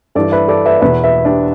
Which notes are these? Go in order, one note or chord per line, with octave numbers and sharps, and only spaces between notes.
G2 E3 A4 D5
B4 E5
A4 D5
B4 E5
E2 B2 B4 E5
B4 E5
D4 G4